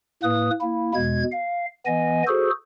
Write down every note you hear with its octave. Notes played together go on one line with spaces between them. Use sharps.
A2 A#3 B4 D#6
A#3 E4
E2 B2 G#3 G#6
F5
E3 B3 D#5 G#5
F#4 G#4 A4 C5